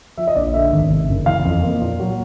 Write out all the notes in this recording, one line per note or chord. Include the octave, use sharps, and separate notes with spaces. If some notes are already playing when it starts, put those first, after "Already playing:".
F3 E5
D#5
A#1 D5
D3 E5
G#1
C3
F#1
E3 F5
F2
A#3
A#2
F#3